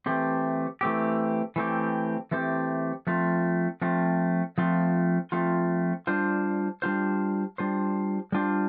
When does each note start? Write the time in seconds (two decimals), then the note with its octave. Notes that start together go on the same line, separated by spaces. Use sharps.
0.06 E3 A3 C4 G4
0.81 E3 A3 C4 G4
1.56 E3 A3 C4 G4
2.31 E3 A3 C4 G4
3.07 F3 A3 C4 F4
3.81 F3 A3 C4 F4
4.58 F3 A3 C4 F4
5.32 F3 A3 C4 F4
6.07 G3 D4 F4 C5
6.82 G3 D4 F4 C5
7.58 G3 D4 F4 C5
8.32 G3 D4 F4 C5